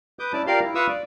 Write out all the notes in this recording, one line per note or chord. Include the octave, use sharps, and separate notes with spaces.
B4 D6 D#6 G6
C#4 E4 D5 A5
F4 G4 A#4 D5 F5 C6
E4
F4 B4 F5 C#6 D#6 E6
D5